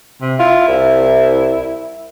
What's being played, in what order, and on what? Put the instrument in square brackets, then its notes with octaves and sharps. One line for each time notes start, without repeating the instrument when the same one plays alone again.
[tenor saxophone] C3
[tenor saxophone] E4 [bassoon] F4
[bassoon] C2